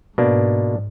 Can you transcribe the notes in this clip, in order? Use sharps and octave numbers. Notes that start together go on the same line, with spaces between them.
G#2 B2 A#3 D4